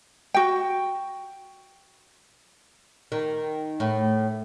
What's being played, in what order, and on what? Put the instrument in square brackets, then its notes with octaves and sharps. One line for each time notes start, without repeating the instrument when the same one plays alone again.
[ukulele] F#4 G5
[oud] D#3
A2